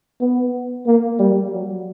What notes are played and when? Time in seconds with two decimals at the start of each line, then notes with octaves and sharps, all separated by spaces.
0.21 B3
0.87 A#3
1.20 G3
1.53 F#3